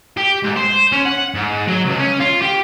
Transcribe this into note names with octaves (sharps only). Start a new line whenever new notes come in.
G4
G#2
C5
C#4
F#5
G#2
F#3
C#2
C#4
F4
G4